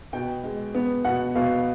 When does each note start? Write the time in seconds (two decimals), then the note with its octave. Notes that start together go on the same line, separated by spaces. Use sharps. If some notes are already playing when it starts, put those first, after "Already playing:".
0.13 B2 G5
0.43 G#3
0.75 B3
1.05 B2 F#5
1.35 B2 F5